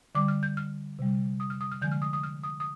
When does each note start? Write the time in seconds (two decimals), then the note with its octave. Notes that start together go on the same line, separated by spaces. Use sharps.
0.15 D3 G3 D6
0.28 F6
0.43 G6
0.57 F6
0.99 C3 G3
1.40 D#6
1.50 F6
1.61 D#6
1.72 F6
1.82 D3 F3 G#3 G6
1.92 F6
2.02 D#6
2.13 D#6
2.23 F6
2.43 D#6
2.60 D#6